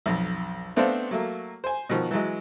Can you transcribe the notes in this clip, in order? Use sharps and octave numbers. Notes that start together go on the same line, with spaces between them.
B1 F2
A3 B3 C4 D4 C5 F5
F#3 A3 A#3
C5 G#5
B2 D#3 F3
E3 F#3 G#3